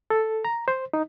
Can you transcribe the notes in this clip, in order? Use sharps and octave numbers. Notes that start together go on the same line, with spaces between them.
A4
A#5
C5
D#4